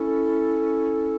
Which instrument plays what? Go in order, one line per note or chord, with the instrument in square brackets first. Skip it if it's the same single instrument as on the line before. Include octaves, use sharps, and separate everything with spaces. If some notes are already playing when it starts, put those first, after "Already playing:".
Already playing: [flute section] C#4 E4 A4